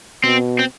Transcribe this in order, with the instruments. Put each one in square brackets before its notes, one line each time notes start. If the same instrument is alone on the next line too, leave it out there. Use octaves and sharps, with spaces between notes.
[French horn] B2 [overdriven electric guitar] C4
[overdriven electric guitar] C4